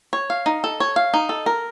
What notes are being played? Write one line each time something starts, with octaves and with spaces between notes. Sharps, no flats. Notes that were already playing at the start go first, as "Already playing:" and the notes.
C#5
F5
D#4
A4
C#5
F5
D#4
A4
A#4